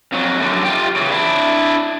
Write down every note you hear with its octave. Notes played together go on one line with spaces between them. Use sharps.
F2 F#3
F#2 D3
F4 G4
C#3 E3
D4 E4